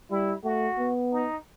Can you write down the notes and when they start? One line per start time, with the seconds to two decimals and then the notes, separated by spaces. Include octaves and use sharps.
0.11 G3 E4
0.44 A3 F#4
0.79 B3
1.13 D#4